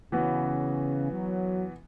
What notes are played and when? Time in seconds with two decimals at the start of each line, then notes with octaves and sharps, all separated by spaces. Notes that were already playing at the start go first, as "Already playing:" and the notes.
0.12 C#3 E3 B3 F#4
1.11 F#3